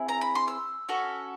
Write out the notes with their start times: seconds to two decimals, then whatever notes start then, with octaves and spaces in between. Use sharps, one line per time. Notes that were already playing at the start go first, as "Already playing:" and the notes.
Already playing: C4 E4 G#4
0.08 A#5
0.21 B5
0.35 C6
0.48 E6
0.89 C#4 F#4 A4